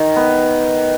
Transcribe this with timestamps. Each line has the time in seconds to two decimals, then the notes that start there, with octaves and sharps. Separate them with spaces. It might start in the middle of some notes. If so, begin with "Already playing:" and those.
Already playing: D#3
0.16 B3